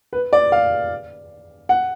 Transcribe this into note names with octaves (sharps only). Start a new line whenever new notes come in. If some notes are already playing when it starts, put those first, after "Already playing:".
B4
D5
F5
F#5